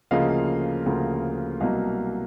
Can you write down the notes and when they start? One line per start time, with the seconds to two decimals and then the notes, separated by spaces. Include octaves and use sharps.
0.11 D2 C#3 F3 A#3 D#5 F5
0.86 D2 C#3 F3 A#3
1.60 C2 B2 F#3 A#3 D#5 F5